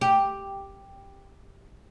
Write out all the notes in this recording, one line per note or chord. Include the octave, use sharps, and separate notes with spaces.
G4